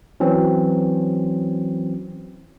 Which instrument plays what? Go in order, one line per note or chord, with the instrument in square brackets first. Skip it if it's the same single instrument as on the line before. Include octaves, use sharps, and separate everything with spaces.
[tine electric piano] E3 F#3 C4 C#4